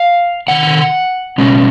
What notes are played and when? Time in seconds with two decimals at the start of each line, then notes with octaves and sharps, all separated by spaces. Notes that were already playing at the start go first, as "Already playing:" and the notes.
Already playing: F5
0.48 C3 D#3 F#5
1.38 B2 G#3 C#4